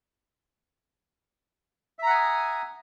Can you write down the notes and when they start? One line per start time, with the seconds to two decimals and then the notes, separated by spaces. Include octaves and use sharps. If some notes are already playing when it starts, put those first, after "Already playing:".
1.99 E5
2.03 A#5
2.07 F#5
2.10 G#5
2.14 D#6